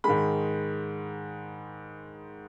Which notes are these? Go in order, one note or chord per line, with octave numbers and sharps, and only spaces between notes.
G#2 D#3 G#3 B5